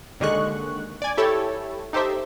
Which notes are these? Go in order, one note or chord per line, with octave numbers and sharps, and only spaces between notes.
D#2 D3 D#3 G#3 C#6 F#6
D5 G#5
E4 G4 A4 C#5
D#4 G4 A4 C5 E5